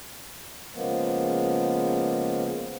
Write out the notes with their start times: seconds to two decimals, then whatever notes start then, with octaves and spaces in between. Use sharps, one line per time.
0.74 C#3 F3 G#3 A#3 B3